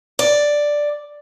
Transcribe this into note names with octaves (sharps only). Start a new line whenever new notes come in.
D5